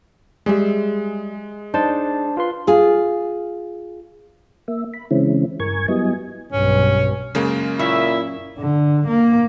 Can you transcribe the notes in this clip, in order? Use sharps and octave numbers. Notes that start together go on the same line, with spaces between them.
G3 G#3 G#4 E5
D4 D#4 C5 A5
F4 B4 C6
F4 G#4
A#3 E5
B5
C#3 E3 G#3 C4 C#4 E4
G2 A#4 G#5 C#6 G#6
F#3 G3 B3 E4 D#5 G#5
B1 G2 C#4
F#2 C#3 G#3 A#3
A#2 E4 C#5 E5
D3
A#3